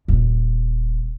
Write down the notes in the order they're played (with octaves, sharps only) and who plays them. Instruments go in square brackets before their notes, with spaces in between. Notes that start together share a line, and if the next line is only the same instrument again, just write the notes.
[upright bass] D#1